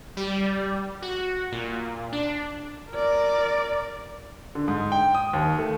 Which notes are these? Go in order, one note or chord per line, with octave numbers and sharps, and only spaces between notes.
G3
F#4
A#2
D4
A#4 D5
D3
G#2
G5
D#6
D#2
A3